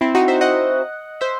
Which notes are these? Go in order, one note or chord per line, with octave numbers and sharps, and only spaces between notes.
C4 E4
D#4 F#4
C5 E5
D#5 F#5
C5 E5